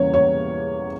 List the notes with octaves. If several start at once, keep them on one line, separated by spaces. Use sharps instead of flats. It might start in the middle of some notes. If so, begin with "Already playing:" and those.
Already playing: E2 C#3 E3 G3 A#3 C#5
C#5